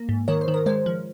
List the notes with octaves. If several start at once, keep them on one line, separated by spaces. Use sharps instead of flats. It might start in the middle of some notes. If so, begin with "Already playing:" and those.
Already playing: A#3
G#2
D#3 A#4 C#5
C5
D#3
A#4
G#3 C5
F3